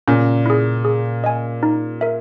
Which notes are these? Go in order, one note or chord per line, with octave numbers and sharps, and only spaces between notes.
A#2 C#3 C#4
E4 G#4
G#4
D#5 G#5
D#4
A#4 E5